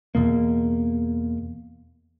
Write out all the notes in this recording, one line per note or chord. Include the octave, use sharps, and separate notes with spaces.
E2 B2 A#3